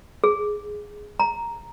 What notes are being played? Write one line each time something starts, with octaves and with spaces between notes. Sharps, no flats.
G#4
A#5